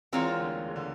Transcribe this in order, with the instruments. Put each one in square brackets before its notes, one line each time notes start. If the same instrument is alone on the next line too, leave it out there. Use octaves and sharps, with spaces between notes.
[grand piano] E2 E3 [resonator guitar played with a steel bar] G#3 C4 F4 A#4 C#5
[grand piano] D2 D3
C#3
D3